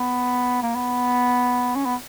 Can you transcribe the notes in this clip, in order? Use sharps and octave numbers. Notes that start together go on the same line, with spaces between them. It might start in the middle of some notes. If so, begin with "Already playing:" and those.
Already playing: B3
A#3
B3
C#4
B3